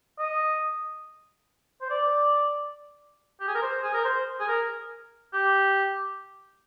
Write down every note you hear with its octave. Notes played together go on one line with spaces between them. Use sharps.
D#5
C5
D5
G4
G#4
A#4
C5
G#4
A#4
C5
G#4
A#4
G4